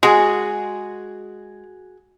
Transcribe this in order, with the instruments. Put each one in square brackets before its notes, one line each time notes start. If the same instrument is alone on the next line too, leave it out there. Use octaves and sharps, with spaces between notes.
[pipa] G#3 [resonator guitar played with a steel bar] F#4 G#4